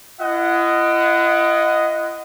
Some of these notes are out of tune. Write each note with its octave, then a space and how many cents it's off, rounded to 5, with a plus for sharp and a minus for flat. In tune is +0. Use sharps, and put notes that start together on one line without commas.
E4 +45 D#5 +0 F#5 +0